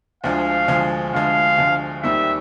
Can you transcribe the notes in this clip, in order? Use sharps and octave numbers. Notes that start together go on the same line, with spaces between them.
D2 D3 F3 G#3 F5
D2 D3 F3 G#3
D2 D3 F3 G#3 F5
D2 D3 F3 G#3
D#2 D#3 G3 C4 D#4 E5